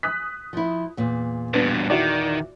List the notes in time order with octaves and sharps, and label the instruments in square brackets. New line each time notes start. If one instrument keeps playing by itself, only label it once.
[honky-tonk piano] D#6 F#6 B6
[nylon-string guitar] F3 E4
E2 A#2
[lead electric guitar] G2 B2 [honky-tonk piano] B3 D4
[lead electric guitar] D#3 [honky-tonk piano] E4 F#4 D5